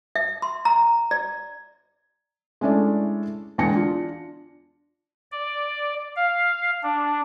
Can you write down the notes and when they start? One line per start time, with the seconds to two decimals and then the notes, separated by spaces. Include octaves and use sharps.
0.15 E5
0.42 C6
0.65 A#5
1.11 D5
2.61 G#3 A3 C#4 D4 E4 D5
3.58 E2 D3 G#3 G#5 A#6 C#7
3.73 D4 F4
5.32 D5
6.16 F5
6.83 D4